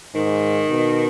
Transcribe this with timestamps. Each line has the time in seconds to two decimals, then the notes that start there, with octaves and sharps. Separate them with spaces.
0.14 G#2 D#3
0.69 B2